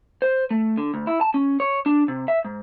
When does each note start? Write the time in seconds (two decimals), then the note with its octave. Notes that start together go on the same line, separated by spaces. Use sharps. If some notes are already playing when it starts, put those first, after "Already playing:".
0.22 C5
0.51 A3
0.78 D3
0.94 D2
1.07 E4
1.21 A5
1.34 C#4
1.60 C#5
1.86 D4
2.08 C3
2.28 E5
2.45 G#2